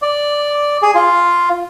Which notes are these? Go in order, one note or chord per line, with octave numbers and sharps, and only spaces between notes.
D5
G#4
F4